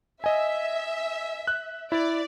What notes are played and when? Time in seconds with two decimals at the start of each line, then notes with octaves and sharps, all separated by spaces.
0.24 D#5 E5 G#5
1.47 F#6
1.92 E4 D5